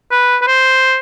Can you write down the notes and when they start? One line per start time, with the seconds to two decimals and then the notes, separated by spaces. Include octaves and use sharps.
0.11 B4
0.42 B4
0.47 C5